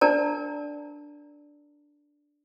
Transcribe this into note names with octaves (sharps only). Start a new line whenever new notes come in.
D4 A#4 D5 A5 A#5